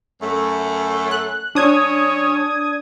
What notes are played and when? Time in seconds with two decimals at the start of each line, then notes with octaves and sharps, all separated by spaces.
0.22 F#2 A3
1.11 F#6
1.55 F#3 C#4 D4 C#5 D#6 G#6